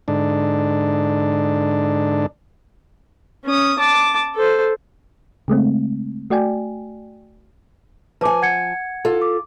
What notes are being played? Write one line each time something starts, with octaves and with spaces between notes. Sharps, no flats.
G#2 D3 D4
C#4 D#6
A5 D6
A4 C5
C#3 G#3 A3 C4
A3 F#4 D5 G5 G#5
F3 B4 G#5 A5 D6
F#5 G#6 C#7
F4 A4
D6